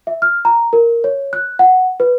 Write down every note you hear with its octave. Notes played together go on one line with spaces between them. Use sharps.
E5
F6
A#5
A#4
C#5
F#6
F#5
B4